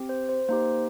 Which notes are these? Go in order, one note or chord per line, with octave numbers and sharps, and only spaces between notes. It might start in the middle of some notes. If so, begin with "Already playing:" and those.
Already playing: C4 G4
C5
C5
A#3 D#4 G4 C5